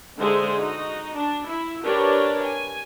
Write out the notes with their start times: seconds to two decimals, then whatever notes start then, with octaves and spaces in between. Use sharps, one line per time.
0.18 D3 G#3 D#4 G#4 C5 E5
0.56 D#4 F#4
1.16 D4
1.47 E4
1.84 D4 G4 A#4 B4 C#5 D5
2.44 G#5